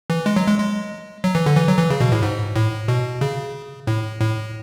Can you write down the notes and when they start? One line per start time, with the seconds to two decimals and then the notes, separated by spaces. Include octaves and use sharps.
0.10 E3
0.26 G#3
0.36 F#3
0.47 G#3
0.59 G#3
1.24 F#3
1.35 E3
1.46 D3
1.57 E3
1.68 F#3
1.78 E3
1.90 C#3
2.00 B2
2.12 A2
2.22 G#2
2.56 A2
2.88 B2
3.21 C#3
3.87 A2
4.20 A2